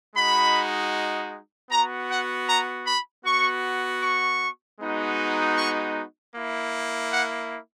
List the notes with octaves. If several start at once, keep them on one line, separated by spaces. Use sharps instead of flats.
G#3 D#4 F#4 B5
B3 F#4 A#5
F#5
A#5
B5
B3 F#4 C#6
C#6
G#3 B3 D#4 F#4
C#6
A#3 E4
F#5